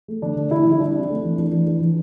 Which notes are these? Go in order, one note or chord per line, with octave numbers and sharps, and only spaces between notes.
A3
D3 D4
D3
D3 E4
D3
E4
G3 D4
C4
A3
E3
E3 D4
E3
E3
E3